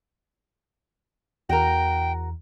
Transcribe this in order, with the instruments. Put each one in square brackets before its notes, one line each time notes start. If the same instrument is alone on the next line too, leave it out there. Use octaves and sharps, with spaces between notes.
[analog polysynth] E2 [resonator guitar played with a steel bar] F#4 A#4 [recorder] G5